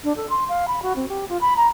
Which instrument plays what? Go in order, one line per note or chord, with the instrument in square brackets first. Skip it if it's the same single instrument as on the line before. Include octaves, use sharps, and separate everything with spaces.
[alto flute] D4
A4
C6
F5
B5
F#4
C4
G4
F4
B5
A#5